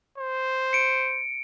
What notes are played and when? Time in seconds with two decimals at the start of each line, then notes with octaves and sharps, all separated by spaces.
0.18 C5
0.73 C#7 D7